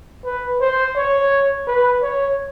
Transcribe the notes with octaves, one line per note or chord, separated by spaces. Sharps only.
B4
C5
C#5
B4
C#5